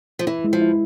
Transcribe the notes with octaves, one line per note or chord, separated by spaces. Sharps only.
F3
E3 E4
G#3
F3
E4